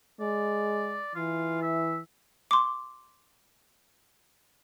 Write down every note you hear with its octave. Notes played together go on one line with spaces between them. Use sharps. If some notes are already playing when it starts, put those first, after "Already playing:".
G#3 D5
E3 F4
E5
C6 D6